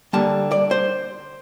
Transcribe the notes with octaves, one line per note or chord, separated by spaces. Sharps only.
D3 G3 A#3 A5
D5
C5